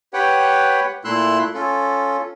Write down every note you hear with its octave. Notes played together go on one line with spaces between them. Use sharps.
G4 B4 C#5 F#5 G5
A#2 A3 E4 C6 E6 F#6
C#4 F4 A4